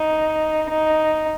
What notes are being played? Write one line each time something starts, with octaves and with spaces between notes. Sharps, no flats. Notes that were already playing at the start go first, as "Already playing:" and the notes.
Already playing: D#4
D#4